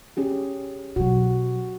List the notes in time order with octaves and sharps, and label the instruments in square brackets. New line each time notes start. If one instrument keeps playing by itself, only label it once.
[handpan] C#4 G4 G#4
[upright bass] B2 F#3 [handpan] F#4